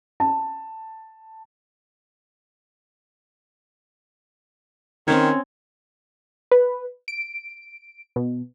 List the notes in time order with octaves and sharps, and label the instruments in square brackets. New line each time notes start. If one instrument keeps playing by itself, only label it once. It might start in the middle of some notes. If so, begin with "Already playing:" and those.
[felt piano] A5
[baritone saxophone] D#3 [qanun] C4 C#4 C#5
[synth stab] B4
D7
B2